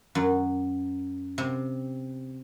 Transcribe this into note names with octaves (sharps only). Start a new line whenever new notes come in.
F#2
C3